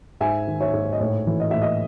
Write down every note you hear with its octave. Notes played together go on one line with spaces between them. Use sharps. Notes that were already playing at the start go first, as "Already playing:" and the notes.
G#2 E5 G#5
D#3
C#5 E5
G#2
D#5
A2 C#5
E3
D#5
A2 E5
D#5